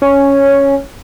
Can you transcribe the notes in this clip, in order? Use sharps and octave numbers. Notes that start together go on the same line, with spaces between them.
C#4